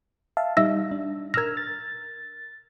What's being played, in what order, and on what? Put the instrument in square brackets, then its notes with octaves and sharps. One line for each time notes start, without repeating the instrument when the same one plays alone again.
[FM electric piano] E5 F5 A5
[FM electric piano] G3 D#4 [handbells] E5 E6 A#6
[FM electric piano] D4
[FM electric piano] A#4 E6 F6 [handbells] G#6 A#6
[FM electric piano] A6